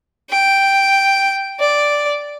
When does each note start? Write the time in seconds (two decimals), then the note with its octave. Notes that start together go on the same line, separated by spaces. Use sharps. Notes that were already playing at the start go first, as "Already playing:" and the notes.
0.30 G5
1.60 D5